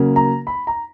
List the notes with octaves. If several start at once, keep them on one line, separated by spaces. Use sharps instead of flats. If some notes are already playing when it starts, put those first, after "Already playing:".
Already playing: C#3 F#3 A#3
A#5
B5
A#5